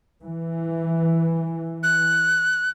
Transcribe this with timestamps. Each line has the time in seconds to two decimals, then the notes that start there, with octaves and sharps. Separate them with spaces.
0.22 E3
1.83 F#6